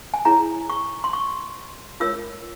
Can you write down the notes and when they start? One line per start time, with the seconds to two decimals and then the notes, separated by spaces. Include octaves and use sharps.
0.14 G#5
0.25 E4 G#4 C#5 A#5
0.70 C#6
1.04 C6
1.13 C#6
2.00 F4 A#4 C#5 E6